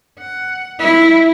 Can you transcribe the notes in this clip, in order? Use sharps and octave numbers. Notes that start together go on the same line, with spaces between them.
F#5
E4